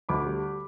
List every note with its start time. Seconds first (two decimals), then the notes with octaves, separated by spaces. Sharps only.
0.09 D2 B5 D6
0.26 G3